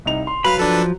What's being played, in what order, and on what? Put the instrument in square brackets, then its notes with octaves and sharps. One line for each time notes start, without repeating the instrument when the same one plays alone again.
[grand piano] C2 D#4 F7
C6
[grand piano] F#3 [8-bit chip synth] B4 F5 F6 [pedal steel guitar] B5
[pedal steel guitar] F3 [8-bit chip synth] D4 A4 B4